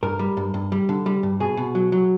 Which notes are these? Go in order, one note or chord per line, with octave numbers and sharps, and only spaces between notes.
G2 A#4
G3
G2
G2
G3
D3
G3
G2
B2 G#4
B2
F#3
F#3